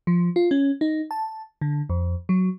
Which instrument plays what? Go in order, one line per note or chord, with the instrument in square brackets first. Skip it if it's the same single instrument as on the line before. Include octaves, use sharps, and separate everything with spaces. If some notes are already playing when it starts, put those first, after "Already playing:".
[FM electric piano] F3
F4
C#4
D#4
A5
D3
F2
F#3